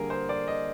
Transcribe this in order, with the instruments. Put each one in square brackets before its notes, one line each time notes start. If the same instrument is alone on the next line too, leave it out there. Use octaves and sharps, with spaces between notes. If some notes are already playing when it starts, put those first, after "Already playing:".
Already playing: [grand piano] D3 G3 A#3 G#4 A#4
C5
D5
D#5